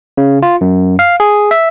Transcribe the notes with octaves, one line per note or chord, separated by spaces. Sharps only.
C#3
F4
F#2
F5
G#4
E5